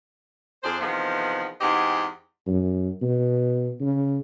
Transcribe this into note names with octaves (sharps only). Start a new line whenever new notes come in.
F2 D4 G#4 C5
E2 C3 D#3 F3 B3
E2 G#2 C4 G4 D#5 F#5
F#2
B2
C#3